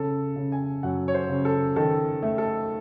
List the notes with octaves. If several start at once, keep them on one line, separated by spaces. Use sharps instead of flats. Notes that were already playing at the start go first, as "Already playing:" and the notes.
Already playing: C#3 A4
C#3
G#5
F#2 F#5
C#5
C5
C#3
A4
D#3 A4
A3
A4